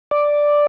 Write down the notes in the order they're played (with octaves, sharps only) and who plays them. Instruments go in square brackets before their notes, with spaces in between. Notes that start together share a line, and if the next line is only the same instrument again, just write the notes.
[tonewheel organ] D5